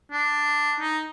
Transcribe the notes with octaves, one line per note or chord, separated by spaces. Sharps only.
D4
D#4